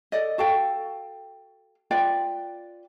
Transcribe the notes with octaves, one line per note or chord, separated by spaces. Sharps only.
A4 D5 D#5
F#4 A4 F5 G5
F4 B4 D5 G5